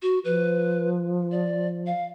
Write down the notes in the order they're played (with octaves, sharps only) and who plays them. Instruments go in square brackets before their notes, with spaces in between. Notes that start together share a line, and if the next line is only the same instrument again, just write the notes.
[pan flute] F#4
[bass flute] F3 [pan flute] B4
[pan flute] D5
F5